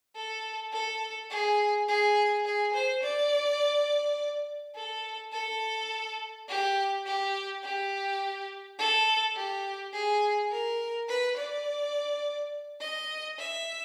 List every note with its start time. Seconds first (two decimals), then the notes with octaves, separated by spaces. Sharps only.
0.15 A4
0.72 A4
1.30 G#4
1.88 G#4
2.45 G#4
2.74 C5
3.03 D5
4.75 A4
5.32 A4
6.48 G4
7.06 G4
7.63 G4
8.78 A4
9.36 G4
9.93 G#4
10.51 A#4
11.08 B4
11.37 D5
12.80 D#5
13.39 E5